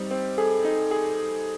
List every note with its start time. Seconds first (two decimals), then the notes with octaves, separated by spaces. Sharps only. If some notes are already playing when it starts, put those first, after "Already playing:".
Already playing: G3 C4 D#4
0.11 C4
0.38 G#4 A4
0.64 D#4
0.91 G#4